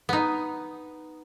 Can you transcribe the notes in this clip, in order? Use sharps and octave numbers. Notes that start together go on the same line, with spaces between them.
B3 D#4